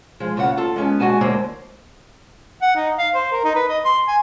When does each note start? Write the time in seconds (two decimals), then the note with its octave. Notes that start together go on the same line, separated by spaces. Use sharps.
0.20 F3 G#3
0.36 D#2 C#3 F4 B4 F#5
0.57 F4 A4 A5
0.76 G#3 B3 C#4
1.00 G#3 F#4 F#5 G#5 A5
1.21 D#2 D3 G#3 A#3 C4
2.62 F#5
2.76 D#4
2.98 F5
3.14 C5
3.32 A#4
3.44 D#4
3.55 B4
3.69 D#5
3.85 C6
4.08 G#5